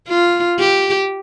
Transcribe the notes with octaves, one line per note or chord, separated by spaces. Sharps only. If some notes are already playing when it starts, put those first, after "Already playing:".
F4
G4